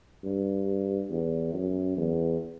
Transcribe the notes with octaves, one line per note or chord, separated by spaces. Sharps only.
G2
E2
F#2
E2